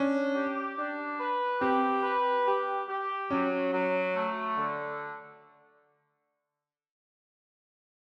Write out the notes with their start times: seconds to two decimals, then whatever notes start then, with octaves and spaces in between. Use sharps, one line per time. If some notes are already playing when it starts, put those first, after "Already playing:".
Already playing: C#4 D4
0.35 G4
0.78 D4
1.19 B4
1.61 C4 G4
2.03 B4
2.47 G4
2.88 G4
3.30 F#3 C#4
3.72 F#3
4.15 A3
4.57 D3